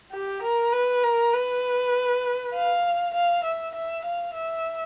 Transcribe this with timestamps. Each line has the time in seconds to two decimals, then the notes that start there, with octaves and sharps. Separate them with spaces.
0.12 G4
0.43 A#4
0.72 B4
1.03 A#4
1.33 B4
2.54 F5
3.14 F5
3.44 E5
3.75 E5
4.05 F5
4.35 E5